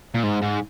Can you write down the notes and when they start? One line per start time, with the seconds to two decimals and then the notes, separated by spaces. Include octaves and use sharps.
0.15 A#2
0.23 G#2
0.42 G#2